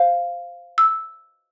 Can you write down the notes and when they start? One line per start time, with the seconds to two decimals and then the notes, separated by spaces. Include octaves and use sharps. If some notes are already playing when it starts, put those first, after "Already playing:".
Already playing: C5 F5
0.78 E6